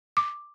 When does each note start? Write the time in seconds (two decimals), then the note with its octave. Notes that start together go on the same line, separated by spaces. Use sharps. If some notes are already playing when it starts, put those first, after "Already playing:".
0.17 D6